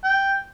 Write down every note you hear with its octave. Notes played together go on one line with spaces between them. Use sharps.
G5